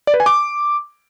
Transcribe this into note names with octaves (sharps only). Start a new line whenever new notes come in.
D5
B4
G#5
D6